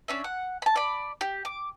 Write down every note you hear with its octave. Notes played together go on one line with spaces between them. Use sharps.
C#4 D4 E5
F#5
A5 B5
D5 B5
G4
D6